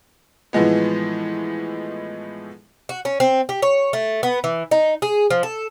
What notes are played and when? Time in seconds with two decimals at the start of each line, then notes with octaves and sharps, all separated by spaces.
0.53 A2 E3 F3 G#3 B3
2.89 F#4
3.05 C#4
3.20 C4
3.49 G4
3.62 C#5
3.93 A3
4.23 B3
4.44 E3
4.71 D#4
5.02 G#4
5.31 F3
5.43 A4